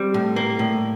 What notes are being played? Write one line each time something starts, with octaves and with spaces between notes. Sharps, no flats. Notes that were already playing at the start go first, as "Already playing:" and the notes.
Already playing: G3 C4
A2
A#3
A2